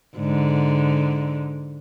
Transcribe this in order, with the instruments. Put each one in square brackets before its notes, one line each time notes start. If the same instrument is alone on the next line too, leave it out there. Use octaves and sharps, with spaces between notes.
[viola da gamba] G#2 D3